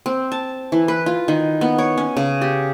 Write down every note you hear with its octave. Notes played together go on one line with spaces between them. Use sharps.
C4
A5
E3
B4
F4
D#3
B3
C#5
C#4
C#3
G4